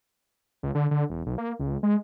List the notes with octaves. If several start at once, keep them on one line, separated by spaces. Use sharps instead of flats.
C#2
D3
D3
E1
B1
A#3
C#2
G#3